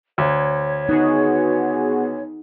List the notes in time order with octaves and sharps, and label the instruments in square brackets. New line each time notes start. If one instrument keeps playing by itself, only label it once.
[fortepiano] D2 [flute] C#5
[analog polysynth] B3 F#4 G#4 [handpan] D#4